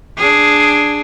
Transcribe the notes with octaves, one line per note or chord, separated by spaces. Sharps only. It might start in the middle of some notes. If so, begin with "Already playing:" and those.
D4 G#4